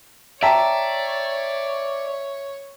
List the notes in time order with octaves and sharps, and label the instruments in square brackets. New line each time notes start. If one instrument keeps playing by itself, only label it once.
[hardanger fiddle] C#5 [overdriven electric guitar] D5 [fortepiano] E5 [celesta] G5 A5 A#5